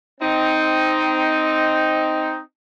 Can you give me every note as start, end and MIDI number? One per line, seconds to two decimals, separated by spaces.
0.21 2.39 60
0.21 2.39 63